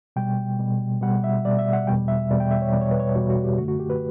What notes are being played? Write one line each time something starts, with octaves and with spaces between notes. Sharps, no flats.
B2 G3 G5
B2 G3
B2 G3 F#5
E5
B2 G3 D5
E5
F#5
E2 B2 G3 G5
E5
E2 B2 G3 D5
G5
E5
C#5
E2 B2 G3 D5
C#5
B4
C#5
E2 B2 G3 F#4
F#4
G4
F#2 D3 A3 F#4
F#4
G4
B4